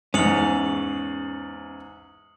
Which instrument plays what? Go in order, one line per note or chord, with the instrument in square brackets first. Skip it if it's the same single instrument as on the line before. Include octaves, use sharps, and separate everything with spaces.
[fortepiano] E2 G#2 [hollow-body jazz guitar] C#4 [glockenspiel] D#6 C#7 F#7